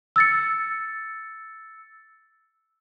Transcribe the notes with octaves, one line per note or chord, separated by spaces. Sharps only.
E6 A6 C#7